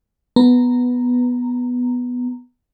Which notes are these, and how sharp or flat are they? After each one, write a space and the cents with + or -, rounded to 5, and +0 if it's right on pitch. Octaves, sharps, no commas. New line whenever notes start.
B3 +0 A#5 -10